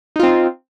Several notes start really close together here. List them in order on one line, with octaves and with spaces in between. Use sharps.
D#4 F4 C4